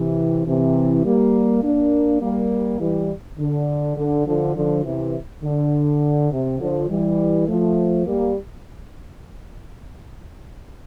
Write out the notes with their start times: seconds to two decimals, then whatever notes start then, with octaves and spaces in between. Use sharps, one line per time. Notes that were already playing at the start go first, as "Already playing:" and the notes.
Already playing: C3 E3
0.46 C3 E3
1.05 G3 A#3
1.63 A#3 D4
2.21 G3 A#3
2.80 E3 G3
3.38 D3
3.96 D3
4.26 D3 F3
4.55 D3 F3
4.84 C3 E3
5.43 D3
6.31 C3
6.60 D3 F3
6.89 E3 G3
7.48 F3 A3
8.06 G3 A#3